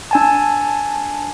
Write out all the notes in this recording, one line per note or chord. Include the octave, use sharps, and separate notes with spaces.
D4 G#5 A5